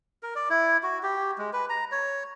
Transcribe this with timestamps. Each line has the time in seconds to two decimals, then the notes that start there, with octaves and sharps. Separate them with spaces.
0.23 A#4
0.35 D5
0.50 E4
0.83 F#4
1.03 G4
1.38 G#3
1.53 B4
1.69 A#5
1.92 C#5